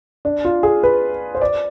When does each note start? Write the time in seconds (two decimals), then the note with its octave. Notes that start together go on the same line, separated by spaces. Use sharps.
0.25 D4
0.45 F4
0.63 G#4
0.83 B4
1.35 C5
1.41 D5